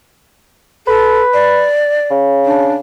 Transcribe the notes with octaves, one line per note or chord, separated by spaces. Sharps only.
A4 B4
D5
C#3
D4